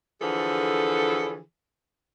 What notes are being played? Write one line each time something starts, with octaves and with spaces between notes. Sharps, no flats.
D3 E3 F3 G#4 A4